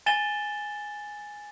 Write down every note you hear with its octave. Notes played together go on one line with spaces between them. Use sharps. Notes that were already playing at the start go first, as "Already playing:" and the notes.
G#5 A6 E7 G7